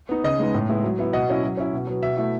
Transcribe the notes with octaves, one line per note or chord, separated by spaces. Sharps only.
B3 D#4
C#3 D#5
G#3 B3 D#4
A2
G#3 B3 E4
F#3
B3 E4
B2 D#5 F#5
F#3 C#4 E4
F#3
C#4 E4
B2
F#3 B3
B2 E5
A3 E4